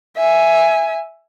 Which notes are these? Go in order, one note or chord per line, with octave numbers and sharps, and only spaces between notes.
E5 G#5